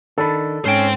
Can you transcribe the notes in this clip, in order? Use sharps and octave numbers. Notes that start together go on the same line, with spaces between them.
D#3 D4 A4 B5
G#2 C#4 C5 G5